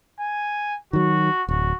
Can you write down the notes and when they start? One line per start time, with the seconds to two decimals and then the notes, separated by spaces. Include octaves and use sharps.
0.20 G#5
0.93 D#3 F#3 F#4
1.49 D1 F#4